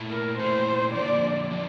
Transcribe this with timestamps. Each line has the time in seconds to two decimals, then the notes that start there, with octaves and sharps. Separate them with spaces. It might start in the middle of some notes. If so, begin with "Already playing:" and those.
Already playing: A#2 A3 E4
0.10 A#4
0.38 A#2 A3 E4 C5
0.94 D3 F3 A#3 D5
1.51 D3 F3